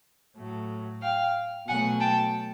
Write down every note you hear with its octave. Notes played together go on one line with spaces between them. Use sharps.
A2 F#3 A3
F5 G5
B2 F#3 A3 F#5 G#5
G5 A5